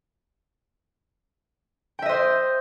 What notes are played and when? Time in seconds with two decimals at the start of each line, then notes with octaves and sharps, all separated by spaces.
1.99 G5
2.02 E5
2.06 D#5
2.09 C5